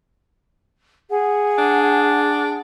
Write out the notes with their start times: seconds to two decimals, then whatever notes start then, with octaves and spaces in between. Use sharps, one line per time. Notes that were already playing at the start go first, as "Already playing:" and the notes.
1.10 G#4 F#5
1.58 D4